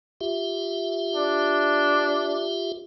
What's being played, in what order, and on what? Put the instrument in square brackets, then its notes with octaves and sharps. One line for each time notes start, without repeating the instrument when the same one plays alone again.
[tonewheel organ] F4 G4 E5
[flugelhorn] D4